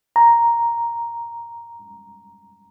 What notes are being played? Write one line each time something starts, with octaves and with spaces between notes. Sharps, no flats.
A#5